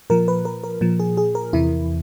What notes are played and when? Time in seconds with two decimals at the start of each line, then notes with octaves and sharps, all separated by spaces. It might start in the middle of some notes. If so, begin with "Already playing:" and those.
0.10 A#2 F3 A#4
0.28 B4
0.45 A#4
0.64 A#4
0.81 A#2 F3
1.00 G#4
1.17 G#4
1.35 A#4
1.53 E2 C3 E3 E4